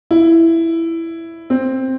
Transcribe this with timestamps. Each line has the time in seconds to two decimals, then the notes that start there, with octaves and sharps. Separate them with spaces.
0.11 E4
1.50 C4